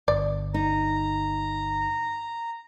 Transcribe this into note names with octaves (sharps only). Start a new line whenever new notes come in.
G1 D5
D#4 A#5